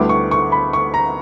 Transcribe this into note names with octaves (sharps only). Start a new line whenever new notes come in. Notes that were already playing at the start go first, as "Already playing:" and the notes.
Already playing: D2 D3 G3 B3 E4 D6
C#6
C#6
B5
C#6
A#5